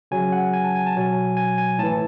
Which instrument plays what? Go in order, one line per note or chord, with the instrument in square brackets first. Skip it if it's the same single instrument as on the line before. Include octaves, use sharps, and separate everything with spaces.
[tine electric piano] C#3 F#3 G#5
F#5
G#5
A5
G#5
A5
B2 F#3 G#5
G#5
G#5
A2 E3 A5